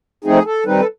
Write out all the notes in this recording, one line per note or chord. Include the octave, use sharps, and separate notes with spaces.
F3 A3 C4 D#4 G#4
A4
D#3 G3 C4 D#4 B4
A4